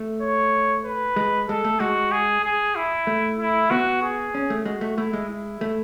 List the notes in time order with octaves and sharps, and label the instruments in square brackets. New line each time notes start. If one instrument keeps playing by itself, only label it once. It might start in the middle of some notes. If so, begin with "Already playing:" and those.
Already playing: [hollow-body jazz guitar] A3
[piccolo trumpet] C#5
B4
[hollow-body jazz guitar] G#3
[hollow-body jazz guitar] G#3 [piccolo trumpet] A4
[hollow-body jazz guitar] A3
[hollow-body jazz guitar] G#3 [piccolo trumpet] F#4
[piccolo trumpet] G#4
G#4
E4
[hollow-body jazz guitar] A3
[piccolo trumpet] E4
[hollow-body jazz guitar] B3 [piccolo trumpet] F#4
[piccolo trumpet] G#4
[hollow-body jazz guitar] C#4
A3
[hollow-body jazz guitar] G#3 [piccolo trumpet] F#4
[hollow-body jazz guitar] A3
[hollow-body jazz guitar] A3 [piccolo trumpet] E4
[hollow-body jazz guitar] G#3
[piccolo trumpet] E4
[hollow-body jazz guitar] A3